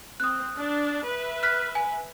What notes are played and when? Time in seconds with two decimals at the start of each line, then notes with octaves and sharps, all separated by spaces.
0.20 C4 D#6 F#6
0.58 D4
1.06 B4 E5
1.43 F6 F#6 B6
1.75 G#5